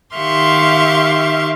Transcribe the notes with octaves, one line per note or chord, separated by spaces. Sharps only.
D#3 G4 E5 F5 C6 C#6